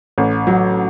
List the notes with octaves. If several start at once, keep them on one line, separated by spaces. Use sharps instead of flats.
A1
F#3